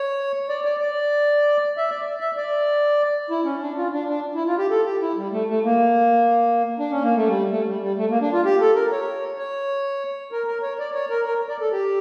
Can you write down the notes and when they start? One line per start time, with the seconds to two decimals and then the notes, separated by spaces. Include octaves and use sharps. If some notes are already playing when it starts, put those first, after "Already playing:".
Already playing: C#5
0.49 D5
0.65 D5
0.80 D5
1.77 E5
1.90 D5
2.20 E5
2.37 D5
3.30 E4
3.45 C#4
3.61 D4
3.77 F4
3.93 D4
4.08 D4
4.35 E4
4.47 F4
4.58 G4
4.70 A4
4.85 G4
5.01 E4
5.17 G3
5.32 A3
5.49 A3
5.64 A#3
6.79 D4
6.91 C#4
7.03 A#3
7.16 A3
7.27 G3
7.51 A3
7.67 G3
7.82 G3
7.97 A3
8.10 A#3
8.21 D4
8.33 F4
8.45 G4
8.60 A4
8.75 A#4
8.92 C#5
9.38 C#5
10.32 A#4
10.47 A#4
10.62 C#5
10.79 D5
10.95 C#5
11.10 A#4
11.25 A#4
11.49 D5
11.61 A4
11.72 G4